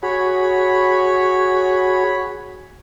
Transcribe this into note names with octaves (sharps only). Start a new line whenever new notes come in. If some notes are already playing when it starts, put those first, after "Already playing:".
F#4 G#4 C#5 B5